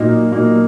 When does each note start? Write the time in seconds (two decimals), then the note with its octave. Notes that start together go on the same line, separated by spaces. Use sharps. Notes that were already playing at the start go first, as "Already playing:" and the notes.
Already playing: A#2 F#3 A#3 D#4
0.32 A#2 F#3 A#3 D#4